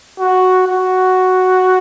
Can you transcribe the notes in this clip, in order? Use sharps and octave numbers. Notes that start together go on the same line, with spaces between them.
F#4
F#4